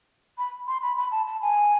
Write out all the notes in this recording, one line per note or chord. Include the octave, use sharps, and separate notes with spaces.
B5
C6
B5
B5
A5
A5
G#5